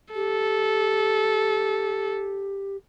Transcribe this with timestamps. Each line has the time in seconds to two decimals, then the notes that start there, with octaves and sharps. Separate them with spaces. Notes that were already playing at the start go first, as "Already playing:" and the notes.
0.15 G4 A4